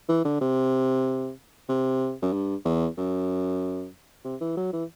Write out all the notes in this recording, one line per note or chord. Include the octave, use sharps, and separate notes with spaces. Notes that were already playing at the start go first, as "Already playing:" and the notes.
E3
D3
C3
C3
F#2
G2
E2
F#2
C3
E3
F#3
E3